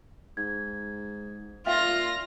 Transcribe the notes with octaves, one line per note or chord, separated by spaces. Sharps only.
G#2 G#6
A#2 F4 E5 F5 G5 F6 A#6